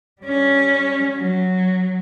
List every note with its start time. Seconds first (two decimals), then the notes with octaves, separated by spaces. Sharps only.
0.22 G3 C#4
1.16 F#3